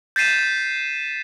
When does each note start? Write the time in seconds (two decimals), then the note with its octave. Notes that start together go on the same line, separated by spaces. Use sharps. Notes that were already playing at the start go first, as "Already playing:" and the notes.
0.16 G6 A6 B6 C7 D#7 E7